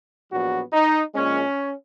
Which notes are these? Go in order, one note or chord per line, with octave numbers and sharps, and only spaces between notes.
A#1 A#2 F#3 B3 F#4
D#4
A#1 A#2 G#3 C#4